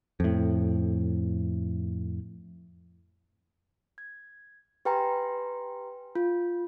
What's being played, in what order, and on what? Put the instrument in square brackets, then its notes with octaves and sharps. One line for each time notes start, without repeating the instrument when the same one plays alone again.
[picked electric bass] F2 A2
[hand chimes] G#6
G4 B4 G5 G#5 A#5 C6
F4